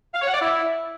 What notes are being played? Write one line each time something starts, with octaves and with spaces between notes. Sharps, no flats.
F5
C#5
F#5
D5
E4